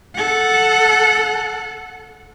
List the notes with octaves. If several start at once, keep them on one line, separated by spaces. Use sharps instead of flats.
A4 F#5